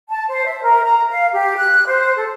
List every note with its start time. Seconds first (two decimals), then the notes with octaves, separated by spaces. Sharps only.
0.09 A5
0.28 C5
0.45 E5
0.62 A#4
0.84 A#5
1.09 F5
1.34 G4
1.57 F#6
1.86 C5
2.16 A4